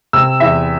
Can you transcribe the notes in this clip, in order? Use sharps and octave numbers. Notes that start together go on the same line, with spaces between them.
C3 E6
E2 E5